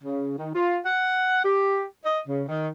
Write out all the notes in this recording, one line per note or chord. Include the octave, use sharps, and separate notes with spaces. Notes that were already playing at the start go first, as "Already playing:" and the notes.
C#3
D#3
F4
F#5
G4
D#5
C#3
D#3